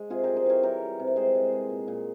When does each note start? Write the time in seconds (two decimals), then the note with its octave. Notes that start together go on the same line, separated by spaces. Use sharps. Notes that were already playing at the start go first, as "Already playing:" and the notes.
Already playing: G#3
0.10 C3 F4 G#4
0.23 G3 G4 A#4
0.36 G#4 C5
0.46 E3 A#4 C#5
0.63 G3 G4 A#4
0.82 G3
1.00 C3
1.07 A#4
1.16 G#3 G#4 C5
1.35 G#3
1.52 G#3
1.70 A#2
1.88 A#2